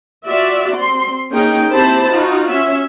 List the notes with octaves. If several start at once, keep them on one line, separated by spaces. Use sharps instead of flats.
F4 F#4 D5 E5
C4 C6
A#3 C#4 D#4 G#4 G5
C4 E4 G4 C5 A5 B5
D#4 F4 F#4
C#4 E5